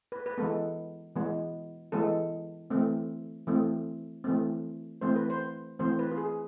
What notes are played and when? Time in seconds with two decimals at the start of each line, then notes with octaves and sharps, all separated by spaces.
0.12 B4
0.26 B4
0.38 E3 G#3 B3 A4
1.16 E3 G#3 B3
1.92 E3 G#3 B3 A4
2.70 E3 A3 C4
3.47 E3 A3 C4
4.24 E3 A3 C4
5.01 E3 A3 C4 C5
5.16 B4
5.30 C5
5.79 E3 A3 C4 C5
5.99 B4
6.11 F4
6.17 G#4